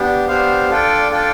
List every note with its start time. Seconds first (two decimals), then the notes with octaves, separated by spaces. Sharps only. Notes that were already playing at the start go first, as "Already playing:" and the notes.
Already playing: B3 D4 G4
0.28 B3 D4 G4 C5 F5
0.69 D4 F4 A4 D5 G5
1.11 D4 F4 A4 D5 G5